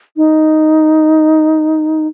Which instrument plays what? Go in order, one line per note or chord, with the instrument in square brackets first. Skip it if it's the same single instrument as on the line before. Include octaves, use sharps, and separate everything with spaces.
[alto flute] D#4